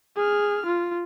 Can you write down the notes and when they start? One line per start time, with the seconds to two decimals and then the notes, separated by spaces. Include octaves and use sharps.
0.17 G#4 F6
0.66 F4